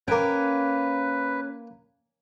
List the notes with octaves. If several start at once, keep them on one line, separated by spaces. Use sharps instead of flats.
A#3 C#4 B4 G5